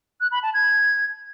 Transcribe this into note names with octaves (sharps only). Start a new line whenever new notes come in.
F#6
B5
A5
G#6